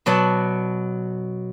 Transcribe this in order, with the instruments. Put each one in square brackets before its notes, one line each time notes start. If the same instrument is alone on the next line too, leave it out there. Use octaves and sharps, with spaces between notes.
[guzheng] B2 F#3 D5 F#5 A5